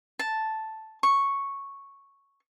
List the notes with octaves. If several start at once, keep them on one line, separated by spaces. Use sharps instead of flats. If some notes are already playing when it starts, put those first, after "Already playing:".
A5
C#6